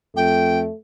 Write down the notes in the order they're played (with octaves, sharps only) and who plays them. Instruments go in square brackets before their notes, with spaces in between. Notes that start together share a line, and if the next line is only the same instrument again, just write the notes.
[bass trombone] F2 [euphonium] A3 [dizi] G5